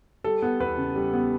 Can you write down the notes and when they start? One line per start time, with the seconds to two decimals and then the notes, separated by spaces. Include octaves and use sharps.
0.24 G3 A4
0.42 B3
0.60 E2 B4
0.77 C#3
0.95 G3
1.13 B3